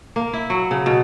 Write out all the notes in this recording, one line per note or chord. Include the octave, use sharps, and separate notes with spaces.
A#3
E4
F#3
C#3
B2